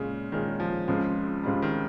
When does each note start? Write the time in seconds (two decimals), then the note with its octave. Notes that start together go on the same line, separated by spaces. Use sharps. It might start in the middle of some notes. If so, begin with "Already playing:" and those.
Already playing: A#2 C#3 G#3 C#4 F4 G#4
0.32 A#2 D#3 G#3 C#4 F4 G#4
0.60 F3
0.88 C#2 C#3 F3 G#3 C4 F4
1.43 C#2 C#3 G3 G#3 C4 F4
1.62 D#3